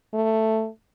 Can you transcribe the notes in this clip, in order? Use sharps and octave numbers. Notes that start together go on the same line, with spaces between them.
A3